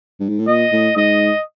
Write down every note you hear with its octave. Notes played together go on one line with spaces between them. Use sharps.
G2
G#2
A2
A#2 D#5
A2
G#2 D#5